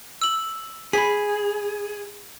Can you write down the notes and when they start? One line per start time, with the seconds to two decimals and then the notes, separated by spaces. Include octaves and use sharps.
0.22 E6 F#7
0.93 G#4 B5 B6